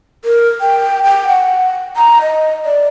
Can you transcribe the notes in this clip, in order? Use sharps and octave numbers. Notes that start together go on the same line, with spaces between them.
A#4
G5
G5
F#5
A#5
D#5
D5